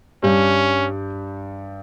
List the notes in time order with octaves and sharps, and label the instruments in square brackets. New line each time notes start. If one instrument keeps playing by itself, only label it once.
[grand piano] G2 G3 [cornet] C#4